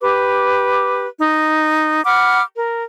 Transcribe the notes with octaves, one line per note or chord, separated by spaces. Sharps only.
G4 B4 D6
D#4
F#5 B5 D6 F6
A#4